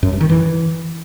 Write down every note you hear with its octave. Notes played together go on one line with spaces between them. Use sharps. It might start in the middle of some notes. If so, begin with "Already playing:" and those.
F#2
G2
D#3
E3